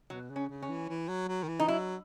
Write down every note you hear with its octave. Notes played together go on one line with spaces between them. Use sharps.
B2 F#3
C#3
C#4
C#3
C#4
E3
E3
F#3
F#3
D#3
E3
D#4
F#3 E4